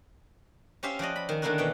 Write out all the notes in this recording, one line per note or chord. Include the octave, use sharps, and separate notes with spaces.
C#4 F4 G4 C5 E5 F5
F3 F#4 D5 D#5
B5
D#3 G#5
D3 D#3 A3 A#3 E4 F#4
B2 E3 G4 G5